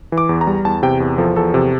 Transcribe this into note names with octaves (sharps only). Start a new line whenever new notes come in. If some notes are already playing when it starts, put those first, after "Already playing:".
E3
D6
E2
A#5
G3
E2 A5
C3 G5
E2
F3 A4
E2 A4
C3